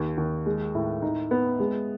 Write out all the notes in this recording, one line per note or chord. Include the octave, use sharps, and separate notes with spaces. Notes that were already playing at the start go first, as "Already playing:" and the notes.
Already playing: D#2
D#2
G#3
A2
D#4
B3
G#3